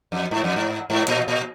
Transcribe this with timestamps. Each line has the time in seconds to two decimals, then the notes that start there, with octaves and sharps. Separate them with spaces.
0.12 F2
0.31 G#2
0.44 F2
0.56 G#2
0.90 G#2
1.08 A#2
1.28 A#2